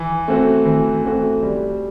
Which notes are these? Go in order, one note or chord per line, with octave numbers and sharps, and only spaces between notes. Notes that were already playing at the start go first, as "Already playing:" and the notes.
Already playing: E3
A3 C4 F#4
E3
A3 C4 F#4
G3